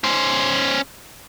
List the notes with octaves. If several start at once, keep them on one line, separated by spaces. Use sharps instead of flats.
C#4 C5